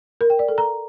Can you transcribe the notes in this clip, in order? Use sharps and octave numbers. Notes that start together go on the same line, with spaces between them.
A#4
G5
D5
A4
A#5